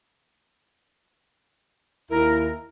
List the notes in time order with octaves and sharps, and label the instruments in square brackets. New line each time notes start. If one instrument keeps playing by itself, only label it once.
[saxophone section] D#2 E4 [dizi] A#4